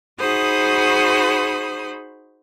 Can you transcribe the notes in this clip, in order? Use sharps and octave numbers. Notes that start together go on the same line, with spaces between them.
D#4 F#4 G#4 C5 B5 D#6